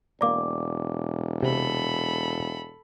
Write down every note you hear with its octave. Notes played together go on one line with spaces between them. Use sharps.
E1 A#3 D5 A#5 D6
C3 A4 B5